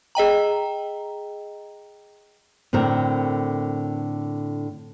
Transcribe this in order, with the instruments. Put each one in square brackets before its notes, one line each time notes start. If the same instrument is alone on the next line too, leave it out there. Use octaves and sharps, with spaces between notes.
[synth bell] G#4 D#5 G5 A#5
[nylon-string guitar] A2 D3 C4 A#4